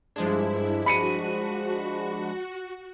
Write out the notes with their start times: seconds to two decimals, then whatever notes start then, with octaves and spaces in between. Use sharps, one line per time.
0.16 G2 F3 G#3 D4 E4 G#4 C5
0.86 F#4 B5 C#7 D#7